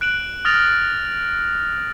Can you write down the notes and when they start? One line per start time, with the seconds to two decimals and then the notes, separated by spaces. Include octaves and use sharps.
0.01 F#6 D7 E7 F#7
0.45 D#6 F6 A6 A#6 F7